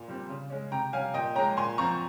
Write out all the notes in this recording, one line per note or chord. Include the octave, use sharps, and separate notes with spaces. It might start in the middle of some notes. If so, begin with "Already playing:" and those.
Already playing: A#2
G3 C4
C#3
G#3 C#4
C3 G5 A#5
G3 C#4 F5 G#5
A#2 D#5 G5
G#3 C#4 G5 A#5
A#2 G#5 C6
F3 C4 A#5 C#6